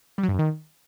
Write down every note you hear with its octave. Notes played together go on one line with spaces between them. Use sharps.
G3
F#3
G2
F#2
D#3